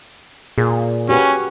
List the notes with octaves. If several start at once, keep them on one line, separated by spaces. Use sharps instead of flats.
A#2 G#4
C#4 F#4 G4 B4